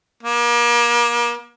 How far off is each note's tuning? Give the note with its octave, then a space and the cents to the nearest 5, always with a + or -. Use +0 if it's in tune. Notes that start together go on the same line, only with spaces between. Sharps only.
A#3 +35